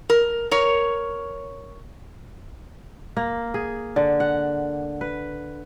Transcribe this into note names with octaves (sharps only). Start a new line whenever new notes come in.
A#4
A#4 C#5
A#3
G#4
D3
F#5
B4